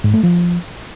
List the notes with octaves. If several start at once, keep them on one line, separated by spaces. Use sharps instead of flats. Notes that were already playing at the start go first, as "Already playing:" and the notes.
G#2
A3
F3